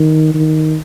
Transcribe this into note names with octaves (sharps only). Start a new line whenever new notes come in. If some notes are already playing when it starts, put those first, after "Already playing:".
Already playing: D#3
D#3